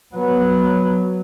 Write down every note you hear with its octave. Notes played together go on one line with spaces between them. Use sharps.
F#3 B3